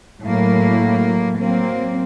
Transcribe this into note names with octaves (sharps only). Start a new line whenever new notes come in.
A2 F#3 A#3
F#3 A#3 C4